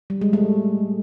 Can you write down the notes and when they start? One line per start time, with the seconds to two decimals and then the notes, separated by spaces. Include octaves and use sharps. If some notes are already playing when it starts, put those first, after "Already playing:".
0.10 G3
0.21 G#3
0.33 A3